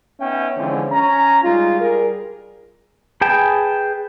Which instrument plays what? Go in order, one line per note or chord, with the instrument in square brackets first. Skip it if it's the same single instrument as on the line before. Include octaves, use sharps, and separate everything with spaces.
[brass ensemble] B3 C#4 D#4 E5 F#5 G5
D3 E3 F3 G#3 C4 C#4
C#4 A#5
G3 G#3 D#4 F4
G3 G#4 A#4
[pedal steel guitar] G#4 B4 G5 A5